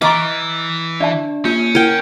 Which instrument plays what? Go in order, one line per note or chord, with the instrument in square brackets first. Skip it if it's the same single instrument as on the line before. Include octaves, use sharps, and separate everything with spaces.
[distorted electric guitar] E3 [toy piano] D#5 A#5 C#6 [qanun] D6 [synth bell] F6 A6
[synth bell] D4 [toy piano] D5 E5 A5
[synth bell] A#3 F4 G6 [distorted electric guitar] C#4
[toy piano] E4 [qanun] A#4 G5 [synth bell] F#5 G#6